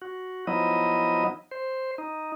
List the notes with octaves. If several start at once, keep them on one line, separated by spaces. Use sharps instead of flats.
F#4
F3 F#3 B3 D#4 E4 D#5
C5
D#4